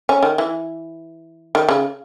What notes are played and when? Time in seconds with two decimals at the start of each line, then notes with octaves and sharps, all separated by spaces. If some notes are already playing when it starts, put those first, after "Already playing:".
0.09 C#4
0.23 D#3
0.38 E3
1.55 D#3
1.69 C#3